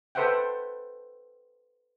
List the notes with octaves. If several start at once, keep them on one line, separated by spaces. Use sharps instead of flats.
A4 B4 C5 E5 F#5 G5